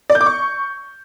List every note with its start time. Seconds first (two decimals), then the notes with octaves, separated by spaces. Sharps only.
0.10 D5
0.15 G6
0.21 D6
0.26 C#6